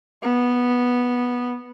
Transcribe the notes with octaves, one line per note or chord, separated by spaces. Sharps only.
B3